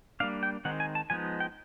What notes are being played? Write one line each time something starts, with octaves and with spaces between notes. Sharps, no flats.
G3 A#3 D4 F5
G5
D#3 G#3 C4 D#4 F#5
G#5
A5
F3 G#3 B3 D#4 G#5
G5